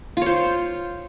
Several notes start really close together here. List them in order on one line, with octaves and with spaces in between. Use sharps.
F4 C#5 C5